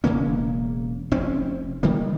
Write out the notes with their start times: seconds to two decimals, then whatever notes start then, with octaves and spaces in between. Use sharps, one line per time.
0.04 E1 C#3 A#3 C#4
1.12 F1 C4 C#4
1.83 D#3 G3 A#3